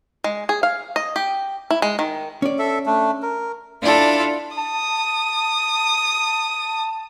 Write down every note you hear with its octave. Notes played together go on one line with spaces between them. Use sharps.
G#3
G#4
F5
D#5
G4
E4
G#3
D#3
C#4 D5
A4 E5
A3 D4
A#4
D4 E4 F4 A4
A5 D#6